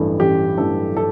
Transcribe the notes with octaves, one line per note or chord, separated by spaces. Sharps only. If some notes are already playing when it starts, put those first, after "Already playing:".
Already playing: A1 G2 E3 A3
A1 G4
G2 E3 A3 A4
A4